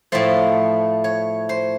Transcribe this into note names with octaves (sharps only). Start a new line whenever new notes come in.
A2 F3 A3 C5
C#5
C5